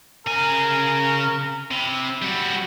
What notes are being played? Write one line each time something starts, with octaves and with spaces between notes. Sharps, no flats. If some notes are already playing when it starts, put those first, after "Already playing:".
C#3 A#4 G#5
C3 E4
G3 F#4